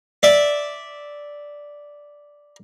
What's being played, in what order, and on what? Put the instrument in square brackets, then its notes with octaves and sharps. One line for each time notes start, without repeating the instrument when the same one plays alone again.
[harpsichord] D5 E5